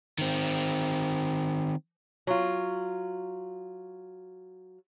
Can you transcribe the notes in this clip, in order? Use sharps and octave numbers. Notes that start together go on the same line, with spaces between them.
D#3 C4
F#3 F4